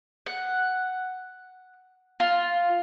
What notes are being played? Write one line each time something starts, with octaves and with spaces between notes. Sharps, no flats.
F#5
F4